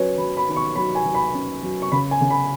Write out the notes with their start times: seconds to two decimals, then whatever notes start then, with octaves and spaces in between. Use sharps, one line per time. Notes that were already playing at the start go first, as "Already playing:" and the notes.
Already playing: F#3 C#4 B4 C#5
0.18 F#3 B5
0.37 B5
0.47 D#3 B5
0.56 C#6
0.76 F#3 B5
0.95 G#5
1.05 F#3
1.15 B5
1.34 C#4
1.63 F#3
1.82 C#6
1.92 C#3 B5
2.11 G#5
2.21 C#3
2.30 B5